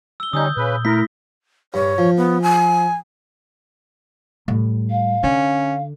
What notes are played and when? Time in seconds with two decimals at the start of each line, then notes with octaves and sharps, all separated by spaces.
0.20 E6 G7
0.33 D3 G3 C#4 D#4 D#6 E6 G6
0.57 A#2 C#3 B4
0.85 A3 E4 A#4 A#6 B6
1.74 G2 C#5
1.98 F3
2.17 B3
2.42 G#5
4.48 A2 G3
4.91 F5
5.23 D3 C#4